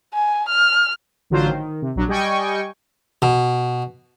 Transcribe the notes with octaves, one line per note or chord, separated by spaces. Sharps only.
G#5
F6
A1 D3 F#3 F4 C5
D#3
C3
A#1 F#3 D4
G3 D#5 G5 G#5 C#6
B2